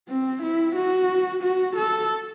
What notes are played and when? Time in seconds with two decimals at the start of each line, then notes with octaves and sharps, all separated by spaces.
0.09 C4
0.43 E4
0.75 F#4
1.43 F#4
1.76 A4